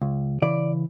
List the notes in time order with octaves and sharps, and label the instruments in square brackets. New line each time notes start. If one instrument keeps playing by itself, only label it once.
[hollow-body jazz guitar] C#2
C#3 E3 D5